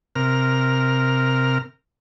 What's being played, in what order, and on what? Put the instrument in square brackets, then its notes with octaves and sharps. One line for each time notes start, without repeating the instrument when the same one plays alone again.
[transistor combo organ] C3 A#4 F6